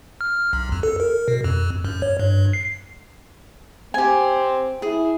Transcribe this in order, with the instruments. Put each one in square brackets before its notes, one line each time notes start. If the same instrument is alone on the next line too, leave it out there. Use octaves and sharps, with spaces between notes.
[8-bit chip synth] F6
B1
F2
A4
A#4
B2
F2
F#2
C#5
G2
C7
[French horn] C4 [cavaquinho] G4 G#5
[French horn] E4 [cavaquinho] G#4